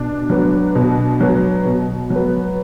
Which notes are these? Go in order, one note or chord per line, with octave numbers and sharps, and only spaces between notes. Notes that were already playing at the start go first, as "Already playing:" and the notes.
Already playing: B2 D4
F#3 B3
B2
F#3 B3
B2
F#3
B3